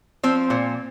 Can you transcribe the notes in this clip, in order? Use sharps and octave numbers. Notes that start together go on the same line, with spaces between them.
F3 C4
A#2